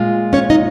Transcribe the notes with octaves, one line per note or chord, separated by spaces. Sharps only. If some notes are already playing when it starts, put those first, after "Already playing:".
Already playing: A#2 G#3 F4
C#4 C#5
D#4 D#5